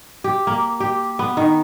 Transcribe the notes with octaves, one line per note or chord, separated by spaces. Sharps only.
G4
A#3
G4
B3
D#3